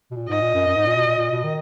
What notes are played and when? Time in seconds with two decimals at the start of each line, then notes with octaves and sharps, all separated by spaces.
0.11 B2
0.16 A#2
0.29 G#2 D#5
0.41 A#2
0.54 F#2
0.67 F#2
0.77 G#2
0.86 A#2
0.96 B2
1.06 A#2
1.18 A#2
1.32 B2
1.44 D#3